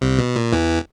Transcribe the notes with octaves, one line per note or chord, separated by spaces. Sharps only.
C2 C3
B2
A#2
E2 E3